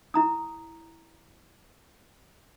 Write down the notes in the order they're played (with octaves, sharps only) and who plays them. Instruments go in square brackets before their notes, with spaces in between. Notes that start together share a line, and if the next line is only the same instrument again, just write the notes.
[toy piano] E4 A#5 D#6